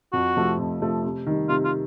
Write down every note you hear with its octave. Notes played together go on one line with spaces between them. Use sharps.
F2 F#4
C3 F3 A3
F2
C3 F3 A3
C3
D#3 G3
C3 F4
F4